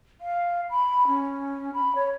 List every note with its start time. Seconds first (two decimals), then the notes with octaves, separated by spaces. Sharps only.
0.21 F5
0.70 B5
1.07 C#4
1.74 B5
1.95 C#5